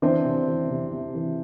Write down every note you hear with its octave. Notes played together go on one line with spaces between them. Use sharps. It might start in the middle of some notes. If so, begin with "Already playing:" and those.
E3 C4 D4
C3
E3
C3
C3
E3